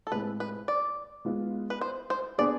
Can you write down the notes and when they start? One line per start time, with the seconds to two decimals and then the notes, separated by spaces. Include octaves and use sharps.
0.07 A4
0.11 A2 G#3 C4 G#4 B4
0.40 B4
0.68 D5
1.25 G#3 B3 F4
1.70 B4
1.81 C5
2.10 C5
2.38 B3 D4 G#4 D5